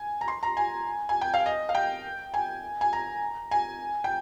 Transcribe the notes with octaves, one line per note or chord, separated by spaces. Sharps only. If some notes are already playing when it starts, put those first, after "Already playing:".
Already playing: G#5
A#5
C6
A#5
G#5
G#5
G5
F5
D#5
F5
G5
G#5
G#5
A#5
G#5
G5